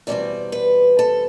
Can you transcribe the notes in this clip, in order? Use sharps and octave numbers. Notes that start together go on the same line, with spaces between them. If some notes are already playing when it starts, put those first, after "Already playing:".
E2 B2 G3 C4 D5
B4
A4